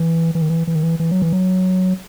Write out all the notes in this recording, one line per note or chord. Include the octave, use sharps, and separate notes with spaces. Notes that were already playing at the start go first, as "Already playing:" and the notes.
Already playing: E3
E3
D#3
E3
E3
D#3
E3
E3
F#3
E3
F#3